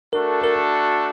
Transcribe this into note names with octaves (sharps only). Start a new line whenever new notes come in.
A3 D4 F#4 A4 A#4
A#4